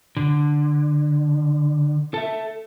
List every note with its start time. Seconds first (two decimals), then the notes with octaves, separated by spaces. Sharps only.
0.17 D3
2.14 A4 E5